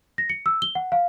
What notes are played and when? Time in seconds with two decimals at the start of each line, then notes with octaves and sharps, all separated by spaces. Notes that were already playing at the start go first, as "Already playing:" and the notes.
0.18 A#6
0.30 C#7
0.46 E6
0.62 G7
0.75 F#5
0.92 F5